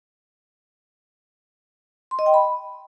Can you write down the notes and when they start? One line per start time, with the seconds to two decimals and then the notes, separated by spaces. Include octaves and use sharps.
2.11 C6
2.19 D#5
2.26 G5
2.34 B5